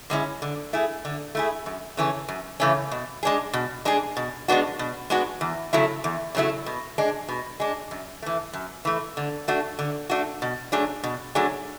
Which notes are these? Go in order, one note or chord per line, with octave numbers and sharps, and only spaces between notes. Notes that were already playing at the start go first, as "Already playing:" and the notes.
D3 G#3 C#4 E4
D3
A3 E4 G#4
D3
A3 E4 G#4
F#2
C#3 E3 A3 C#4
F#2
C#3 E3 A3 C#4
B2
G#3 D4 G#4
B2
G#3 D4 G#4
B2
G#3 B3 D4 F#4
B2
G#3 B3 D4 F#4
E2
C#3 F#3 A3 E4
E2
C#3 F#3 A3 E4
B2
G#3 D4
B2
G#3 D4
F#2
E3 A3
F#2
E3 A3
D3
A3 D4 F#4
D3
A3 D4 F#4
B2
F#3 A3 D4 G#4
B2
F#3 A3 D4 G#4